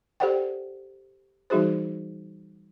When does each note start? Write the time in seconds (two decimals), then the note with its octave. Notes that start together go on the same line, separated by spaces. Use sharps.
0.20 G4 A4 C5 D5 F#5 G5
1.50 E3 G3 D#4 F#4 G#4 C5